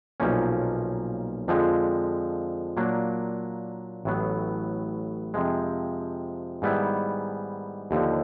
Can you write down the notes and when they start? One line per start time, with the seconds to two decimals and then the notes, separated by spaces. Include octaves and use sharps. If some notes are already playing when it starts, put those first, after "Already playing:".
0.20 B1 A#2 F3 A#3 C#4
1.48 F2 D3 F3 G#3
2.77 A#2 F#3 A#3 D4
4.05 A1 A2 F#3 B3
5.34 F2 C3 F3 G#3
6.62 G#2 D#3 G3 B3 E4
7.91 D#2 D3 F3